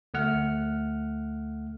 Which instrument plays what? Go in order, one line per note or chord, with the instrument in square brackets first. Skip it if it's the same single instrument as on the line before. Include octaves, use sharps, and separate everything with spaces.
[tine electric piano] D2 A3 F#5 F6